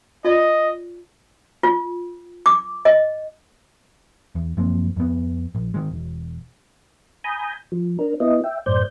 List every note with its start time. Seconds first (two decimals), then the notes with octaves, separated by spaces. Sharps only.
0.25 F4 D5 D#5
1.63 F4
2.46 D6
2.85 D#5
4.35 E2
4.57 F#2 F3 A#3 C4
4.96 F2 B3
5.55 A#1
5.74 D#3 G#3
5.91 E1
7.24 G#5 A#5 B5 D#6 G6
7.72 F3
7.99 D4 A#4
8.20 B3 E4 D#5
8.44 E5 G5
8.66 F#2 A2 C5 D5 G6